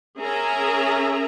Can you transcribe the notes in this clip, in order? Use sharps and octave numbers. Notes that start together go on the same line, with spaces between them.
C#4 G#4 A#4 E5 A#5